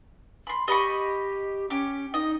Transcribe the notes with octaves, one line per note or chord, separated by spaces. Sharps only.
B5 C6
G4 D#5 B5 C#6
C#4 G4
D#4 D#5